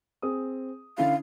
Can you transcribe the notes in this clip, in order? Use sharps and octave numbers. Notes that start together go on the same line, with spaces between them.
C4 G#4 D#6
D3 C#4 E4 F5